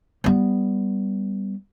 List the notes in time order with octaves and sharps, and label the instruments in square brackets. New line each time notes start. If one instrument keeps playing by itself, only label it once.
[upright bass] G3 B3